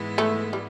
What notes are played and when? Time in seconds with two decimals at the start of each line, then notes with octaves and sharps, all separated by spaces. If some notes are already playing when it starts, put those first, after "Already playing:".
Already playing: G#2 E3 G#3 B3 E4
0.18 A3
0.53 G3